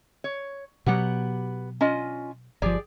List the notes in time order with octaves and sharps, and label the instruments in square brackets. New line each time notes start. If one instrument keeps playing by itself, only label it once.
[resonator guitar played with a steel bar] C#5
[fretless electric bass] B2 F#3 [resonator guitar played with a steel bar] B3 G4 F#5
[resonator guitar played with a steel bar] C#4 F4 D#5
[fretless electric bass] G1 F3 [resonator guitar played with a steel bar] G4 G#4 D5